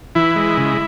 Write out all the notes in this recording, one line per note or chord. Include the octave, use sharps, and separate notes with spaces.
E3 E4
G#3
C#3